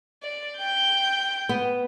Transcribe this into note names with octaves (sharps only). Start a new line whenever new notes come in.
D5
G5 G6
B3